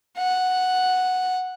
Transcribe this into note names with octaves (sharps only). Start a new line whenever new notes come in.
F#5